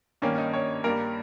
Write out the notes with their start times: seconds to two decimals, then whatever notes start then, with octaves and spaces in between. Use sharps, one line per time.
0.22 G2 D#3 A#3 C#4
0.38 D#4
0.53 C#5
0.84 G2 G3 A#3 A#4